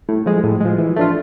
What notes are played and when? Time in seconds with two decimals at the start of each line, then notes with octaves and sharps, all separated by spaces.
0.09 A2
0.26 F3 G#3
0.44 A2
0.60 F3 G#3
0.78 E3
0.96 A3 D4 F4